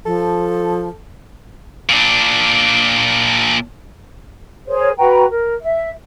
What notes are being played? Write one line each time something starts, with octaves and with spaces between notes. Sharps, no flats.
F3 A4
A#2 D4
G#4 A#4 C5 C#5
F#4 B4 G5 A#5
A#4
E5